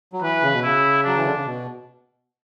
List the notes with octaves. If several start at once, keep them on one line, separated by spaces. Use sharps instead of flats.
F#3
E3 B4
C#3
B2
C#3 E4
F#3 D4
E3
D3
C#3
B2